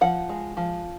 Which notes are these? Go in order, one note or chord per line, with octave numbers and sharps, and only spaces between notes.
F3 F#5
G#3
F3